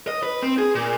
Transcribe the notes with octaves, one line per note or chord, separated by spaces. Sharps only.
D#5
B4
C4
G#4
A#2